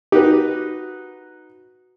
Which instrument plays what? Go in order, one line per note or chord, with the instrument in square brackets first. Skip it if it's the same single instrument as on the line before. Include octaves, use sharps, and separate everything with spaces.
[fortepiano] D#4 F#4 B4 [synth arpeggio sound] G4